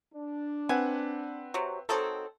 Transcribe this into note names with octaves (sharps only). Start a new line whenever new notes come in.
D4
C4 B4 F#5 G#5
C3 F#3
D#3 F#3 C4 A4